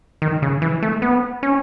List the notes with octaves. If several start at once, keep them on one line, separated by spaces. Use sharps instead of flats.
D#3
C#3
E3
A3
B3
C#4